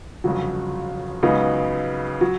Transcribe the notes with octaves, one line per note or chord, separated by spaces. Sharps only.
G1 F2 C#3 F#3
C#2 C#3 F#3 B3 D#4
F#3